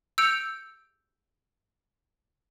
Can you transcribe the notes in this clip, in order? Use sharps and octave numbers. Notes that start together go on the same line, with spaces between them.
E6 G6 C#7 D7 F7